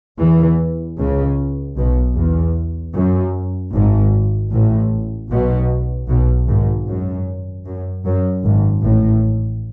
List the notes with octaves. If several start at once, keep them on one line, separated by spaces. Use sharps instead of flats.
E2 E3
C#2 C#3
B1 B2
E2
F#2
G#1 G#2
A1 A2
B1 B2
B1 B2
G#1 G#2
F#2
F#2
F#2
G#1 G#2
A1 A2